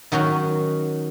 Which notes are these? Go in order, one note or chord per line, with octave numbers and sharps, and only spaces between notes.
D#3 F#3 C#4 F#4